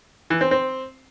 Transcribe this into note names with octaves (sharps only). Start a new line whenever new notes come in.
E3
C4
C4